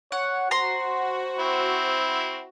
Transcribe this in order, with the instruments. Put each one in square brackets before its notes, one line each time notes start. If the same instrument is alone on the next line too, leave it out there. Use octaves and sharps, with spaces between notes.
[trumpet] C#5 [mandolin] F#5
[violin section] F#4 [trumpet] C5 [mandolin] A#5 C6
[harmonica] C4 E4